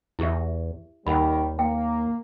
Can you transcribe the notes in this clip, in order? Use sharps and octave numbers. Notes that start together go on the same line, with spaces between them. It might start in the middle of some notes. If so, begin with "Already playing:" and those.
E2 E4 G4 E5
D#2 D#3 G3 A#4 F#5 B5
A#3 G5